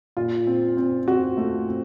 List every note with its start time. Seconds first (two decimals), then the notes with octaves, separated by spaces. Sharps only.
0.17 A#2 F4
0.47 C4
0.77 C4
1.08 C4 F#4
1.37 A3
1.68 C4